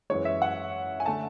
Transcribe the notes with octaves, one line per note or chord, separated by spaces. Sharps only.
F#2 E3 G#3 C#5
E5
F#5
G#5
D3 A3 A5